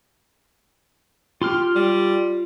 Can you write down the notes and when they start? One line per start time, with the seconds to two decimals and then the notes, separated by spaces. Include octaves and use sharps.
1.42 F4 G4 C6 F6
1.75 G3